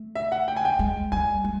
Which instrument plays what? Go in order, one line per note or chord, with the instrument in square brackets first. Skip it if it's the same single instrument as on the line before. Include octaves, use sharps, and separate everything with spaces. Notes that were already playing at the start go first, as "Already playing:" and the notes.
Already playing: [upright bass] A3
[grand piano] E5
F#5
G5
G#5
G5
[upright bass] G#3
[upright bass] G3 [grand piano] G#5
[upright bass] G#3